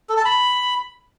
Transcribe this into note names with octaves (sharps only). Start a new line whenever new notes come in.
A4
A5
B5